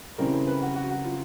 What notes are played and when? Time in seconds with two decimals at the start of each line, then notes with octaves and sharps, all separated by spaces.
0.18 C#3 E3 G3 C4 A#4
0.33 C5
0.47 B4
0.62 F#4
0.75 F#4
0.89 F#4
1.04 F4